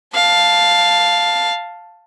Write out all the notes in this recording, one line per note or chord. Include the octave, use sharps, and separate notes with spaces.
F5 A5